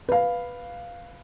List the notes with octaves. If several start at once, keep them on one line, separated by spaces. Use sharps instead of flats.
B4 F5